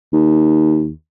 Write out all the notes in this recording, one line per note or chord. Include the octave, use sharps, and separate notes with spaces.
D#2